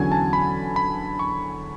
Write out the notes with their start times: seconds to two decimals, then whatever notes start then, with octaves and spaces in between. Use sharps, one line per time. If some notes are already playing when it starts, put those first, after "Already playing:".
Already playing: E2 D3 F#3 C#4 G#5
0.12 A5
0.33 B5
0.76 B5
1.19 C#6